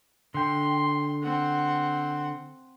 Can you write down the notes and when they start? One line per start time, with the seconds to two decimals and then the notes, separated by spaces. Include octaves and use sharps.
0.34 D3 G5 C6
1.23 C4 F#5